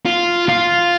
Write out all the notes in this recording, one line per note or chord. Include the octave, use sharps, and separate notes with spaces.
F4
F4